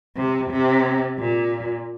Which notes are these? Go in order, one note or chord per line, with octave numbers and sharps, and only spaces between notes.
C3
C3
A#2